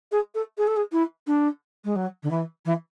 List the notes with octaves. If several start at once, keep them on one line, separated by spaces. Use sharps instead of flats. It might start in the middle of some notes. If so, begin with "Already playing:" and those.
G#4
A4
G#4
A4
G#4
E4
D4
G#3
F#3
D3
E3
E3